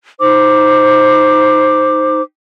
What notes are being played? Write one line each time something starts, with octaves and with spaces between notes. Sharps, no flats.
D#4 C5 D6